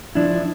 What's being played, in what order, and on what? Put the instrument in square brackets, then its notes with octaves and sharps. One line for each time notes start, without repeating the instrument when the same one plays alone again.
[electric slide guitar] F3 D4 E4